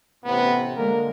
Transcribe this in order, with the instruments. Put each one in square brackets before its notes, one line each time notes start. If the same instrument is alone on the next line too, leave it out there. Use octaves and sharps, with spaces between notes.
[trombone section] A1 A2 C3 [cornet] B3
[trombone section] D3 A#3 [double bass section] G#3 [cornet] A#4